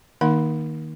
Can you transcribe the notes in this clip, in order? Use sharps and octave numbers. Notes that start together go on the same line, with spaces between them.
D#3 A#3 D#4 F#5 C6